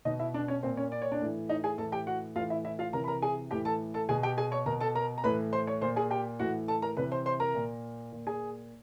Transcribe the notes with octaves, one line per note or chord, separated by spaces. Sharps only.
B2 D#4 D#5
E4 E5
D4 D5
C#4 C#5
A#2 C4 C5
C#4 C#5
D5
C#5
D4 D5
A2 E3
D#4 D#5
G#4 G#5
A2 E3 A4 A5
G4 G5
F#4 F#5
A2 E3 F4 F5
E4 E5
E4 E5
F4 F5
C3 E3 A#4 A#5
B5
A#4 A#5
G#4 G#5
A2 E3 G4 G5
A4 A5
A4 A5
B2 G#4 G#5
G4 G5
G#4 G#5
C#5 C#6
B2 A#4 A#5
A4 A5
A#4 A#5
A#5
A2 E3 B4 B5
C5 C6
C#5 C#6
A#2 C5 C6
G#4 G#5
G4 G5
A2 E3 F#4 F#5
A4 A5
A#4 A#5
C3 E3 B4 B5
C5 C6
C5 C6
A#4 A#5
A#2
A#2
G#4 G#5